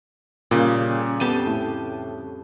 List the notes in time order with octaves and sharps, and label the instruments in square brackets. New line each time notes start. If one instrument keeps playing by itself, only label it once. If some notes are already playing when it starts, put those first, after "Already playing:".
[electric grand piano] A#2 [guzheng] C#3 G3
[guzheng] F2 G4 A5 [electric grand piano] B3 D#7
[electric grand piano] A2